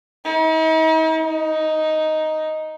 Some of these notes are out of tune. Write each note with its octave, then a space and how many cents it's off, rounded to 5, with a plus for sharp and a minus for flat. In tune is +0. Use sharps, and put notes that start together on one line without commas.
D#4 +45
D#4 +5